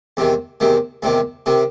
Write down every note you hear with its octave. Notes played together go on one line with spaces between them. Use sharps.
E2 C3 D#3
E2 C3 D#3
E2 C3 D#3
C3 D#3